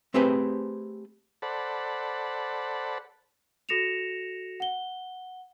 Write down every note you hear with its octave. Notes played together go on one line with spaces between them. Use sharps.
A3 C4 G4 G#4 B4 C5
A4 C5 D5 F#5 A5 B5
F#4 A4 A#6 C#7 E7 F7
F#5 G7